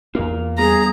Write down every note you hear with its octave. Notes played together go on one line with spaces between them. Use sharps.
E2 A#3 F4 A#4 F5
G3 B3 G#4 A#5